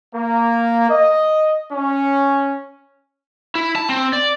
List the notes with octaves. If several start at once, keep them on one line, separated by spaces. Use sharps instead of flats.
A#3
D#5
C#4
E4
A5
C4
D5